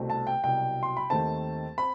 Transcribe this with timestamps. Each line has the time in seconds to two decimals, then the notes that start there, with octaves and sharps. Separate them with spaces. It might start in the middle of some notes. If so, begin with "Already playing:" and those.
Already playing: C2 B2 A3 C4
0.10 A5
0.27 G5
0.43 C2 B2 F#3 G5
0.83 C6
0.97 B5
1.10 D#2 D#3 A3 C4 A5
1.78 C4 B5